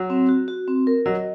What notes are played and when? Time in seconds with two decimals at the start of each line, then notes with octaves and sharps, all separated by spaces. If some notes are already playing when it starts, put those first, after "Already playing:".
Already playing: F#3
0.10 C4
0.29 F#4
0.48 F#4
0.68 C4
0.87 A#4
1.06 F#3 D#5